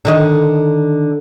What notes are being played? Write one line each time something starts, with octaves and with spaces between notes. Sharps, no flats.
D3 D#3 D#5